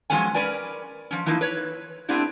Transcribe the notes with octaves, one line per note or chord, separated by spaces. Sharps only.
F3 F#3 G#3 B3 C#4 G#5
C#4 A#4 B4 D5 G#5
F3 C#4
E3 F3 A#3 D#4 E4
B4 C#5
A3 B3 C4 D4 E4 G4